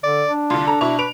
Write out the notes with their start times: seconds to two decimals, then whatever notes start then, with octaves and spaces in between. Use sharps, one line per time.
0.04 D3 D5
0.29 D4
0.50 C2 D3 F4
0.67 A4 A#5
0.81 B2 E4 C#6 F7
0.99 B4 D7 F7